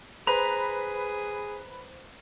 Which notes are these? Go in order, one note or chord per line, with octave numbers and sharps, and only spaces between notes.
G#4 B4 C5 A#5